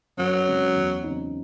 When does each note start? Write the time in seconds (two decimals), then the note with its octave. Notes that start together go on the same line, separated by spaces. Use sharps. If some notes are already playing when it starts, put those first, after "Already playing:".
0.17 F#2 F#3
0.47 C#3 G#3 C4
0.76 E2
1.04 C#3 F#3 C4 D#4